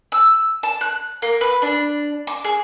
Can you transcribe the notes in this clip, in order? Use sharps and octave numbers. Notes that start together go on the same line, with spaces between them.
E6
A5
F#6
A#3
B4
D4
D6
G#4